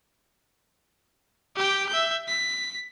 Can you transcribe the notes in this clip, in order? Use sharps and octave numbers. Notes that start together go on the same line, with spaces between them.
G4 G5
E5 G6
B6